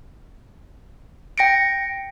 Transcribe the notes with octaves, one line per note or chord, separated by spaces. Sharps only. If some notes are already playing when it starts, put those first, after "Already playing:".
G5 A#6 C#7 D7